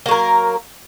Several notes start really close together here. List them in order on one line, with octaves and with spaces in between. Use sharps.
A#3 F#3 A#4